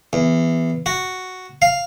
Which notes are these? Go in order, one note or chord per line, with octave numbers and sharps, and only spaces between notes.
E2
F#4
F5